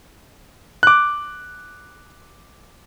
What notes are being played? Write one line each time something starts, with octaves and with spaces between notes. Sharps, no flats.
D6 F#6